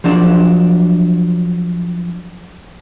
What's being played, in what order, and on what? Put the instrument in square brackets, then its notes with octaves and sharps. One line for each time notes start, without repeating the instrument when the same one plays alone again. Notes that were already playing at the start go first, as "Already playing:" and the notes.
[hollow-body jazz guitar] F3 F#3 D4